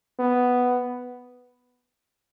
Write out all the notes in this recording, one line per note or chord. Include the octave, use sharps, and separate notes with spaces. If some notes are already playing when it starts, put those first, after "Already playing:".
B3